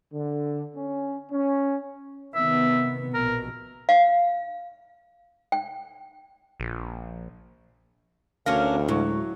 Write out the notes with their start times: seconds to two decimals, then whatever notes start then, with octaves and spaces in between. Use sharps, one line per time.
0.13 D3
0.75 C#4
1.31 C#4
2.35 C3 D#3 B3 E5
3.14 A#1 B2 A#4
3.89 F5
5.52 G5
6.60 A#1
8.46 D2 C#4 D4 A#4 F5
8.89 A2 F#3 G#3 E4 C#6